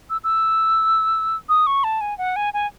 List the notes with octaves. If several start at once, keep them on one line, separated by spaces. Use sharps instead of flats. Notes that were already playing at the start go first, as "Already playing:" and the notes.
E6
E6
D#6
C#6
A5
G#5
F#5
G#5
G#5